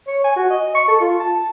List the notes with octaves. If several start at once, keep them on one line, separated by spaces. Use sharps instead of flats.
C#5
G#5
F#4
D#5
C#6
A4
F4
A5